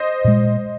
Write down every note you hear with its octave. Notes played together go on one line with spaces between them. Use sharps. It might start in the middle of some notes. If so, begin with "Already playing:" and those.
Already playing: C5 D#5
A#2 G#3